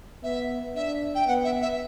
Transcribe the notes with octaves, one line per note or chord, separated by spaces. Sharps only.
B3 E5
D4 E5
G5
B3 F#5
E5
E5